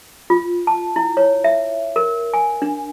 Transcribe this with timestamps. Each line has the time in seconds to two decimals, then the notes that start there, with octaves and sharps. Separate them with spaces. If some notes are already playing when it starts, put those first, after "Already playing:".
0.30 F4
0.67 A5
0.96 E4
1.17 C#5
1.44 E5
1.96 A#4
2.34 G#5
2.62 D4